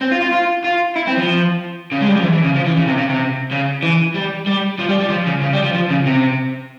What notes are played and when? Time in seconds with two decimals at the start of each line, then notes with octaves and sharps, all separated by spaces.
0.01 C4
0.12 F4
0.22 F4
0.33 F4
0.64 F4
0.96 E4
1.07 C4
1.17 F3
1.92 C#3
2.01 G#3
2.09 G3
2.16 F3
2.24 E3
2.34 E3
2.45 C#3
2.56 F3
2.67 E3
2.77 C#3
2.88 C3
2.98 C#3
3.09 C3
3.52 C#3
3.83 E3
4.14 G3
4.46 G3
4.79 F3
4.89 G3
5.00 G3
5.10 F3
5.27 C#3
5.42 C#3
5.53 G3
5.63 F3
5.75 F3
5.90 C#3
6.06 C3